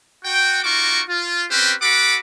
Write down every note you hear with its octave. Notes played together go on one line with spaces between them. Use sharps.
F#4 G5
D#4 F4 F#4 C#6 D6
F4
C4 C#4 G4 B4 C5
F#4 A4 F#5 B5 D6